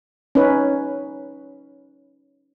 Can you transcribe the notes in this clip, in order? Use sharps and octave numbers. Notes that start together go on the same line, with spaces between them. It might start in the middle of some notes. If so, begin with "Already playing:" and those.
C#4 D#4 B4